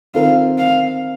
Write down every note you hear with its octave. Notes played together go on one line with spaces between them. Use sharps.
D#3 C4 F4 A#4 F5
F5